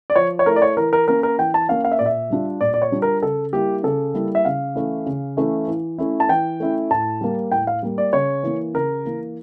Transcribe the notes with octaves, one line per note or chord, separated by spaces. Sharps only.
D5
F3 C#5
C#5
A3 E4 A#4
D5
C#5
E3 A#4
A#4
A#3 C#4 A#4
A#4
E3 G5
A5
A#3 C#4 F5
F5
E5
A#2 D5
E5
G3 D4 F4
A#2 D5
D5
C#5
G3 D4 F4
A#4
C#3 A4
G3 A#3 E4 G4
C#3 A4
G3 A#3 E4
E5
C#3 F5
E3 A3 C#4 E4
C#3
E3 A3 C#4 E4
E3
A3 C#4 E4
A5
E3 G5
A3 C#4 E4
A2 A5
G3 A#3
A2 G5
F5
G3 A#3
D5
C#3 C#5
E3 A#3
C#3 A#4
E3 A#3